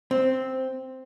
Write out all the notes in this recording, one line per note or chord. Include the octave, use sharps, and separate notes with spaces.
C4